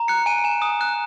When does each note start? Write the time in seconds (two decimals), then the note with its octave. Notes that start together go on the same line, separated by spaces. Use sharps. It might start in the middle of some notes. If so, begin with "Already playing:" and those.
Already playing: A#5
0.08 F#6 C#7
0.26 G#5 D#7
0.44 G#5 E7
0.62 D#6
0.81 F#6